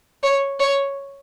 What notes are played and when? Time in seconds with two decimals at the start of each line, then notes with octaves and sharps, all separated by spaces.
0.23 C#5
0.60 C#5